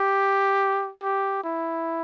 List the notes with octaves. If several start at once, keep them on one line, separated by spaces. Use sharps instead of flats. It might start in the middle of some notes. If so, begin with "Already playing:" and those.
Already playing: G4
G4
E4